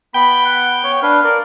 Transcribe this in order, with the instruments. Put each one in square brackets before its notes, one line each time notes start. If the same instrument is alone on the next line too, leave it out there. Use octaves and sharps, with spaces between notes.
[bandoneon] B3 [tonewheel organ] G5 G6 [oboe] B5
[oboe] F#5
C#5
[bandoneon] D4 B4 [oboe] F5
[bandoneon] A#4 D5